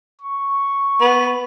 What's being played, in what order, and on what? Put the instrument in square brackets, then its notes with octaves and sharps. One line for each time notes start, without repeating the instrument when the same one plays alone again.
[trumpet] C#6
[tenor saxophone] B3